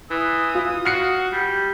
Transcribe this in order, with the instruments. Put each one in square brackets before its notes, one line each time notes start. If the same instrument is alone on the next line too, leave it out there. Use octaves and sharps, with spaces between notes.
[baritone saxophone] E3 [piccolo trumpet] D#6
[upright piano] F4
[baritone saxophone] F#4 [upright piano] F6 C7 C#7
[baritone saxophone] G3